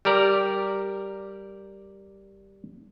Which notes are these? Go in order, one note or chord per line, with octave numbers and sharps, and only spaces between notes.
G3 G4 A#4 D5